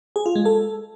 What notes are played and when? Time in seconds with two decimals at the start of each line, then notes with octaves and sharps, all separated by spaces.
0.16 G#4
0.26 F4
0.36 G#3
0.45 A4